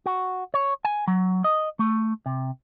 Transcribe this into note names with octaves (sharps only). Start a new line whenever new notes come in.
F#4
C#5
G#5
F#3
D#5
A3
C3